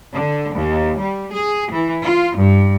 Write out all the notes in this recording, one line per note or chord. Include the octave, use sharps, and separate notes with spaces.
D3
D#2
G3
G#4
E3
F4
G2